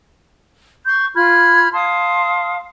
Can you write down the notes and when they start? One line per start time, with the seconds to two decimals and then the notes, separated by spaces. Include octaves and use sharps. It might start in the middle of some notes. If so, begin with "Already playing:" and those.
0.86 C6 C#6 G6
1.16 F4 B5 F6 G#6
1.73 F5 A5 C6 D#6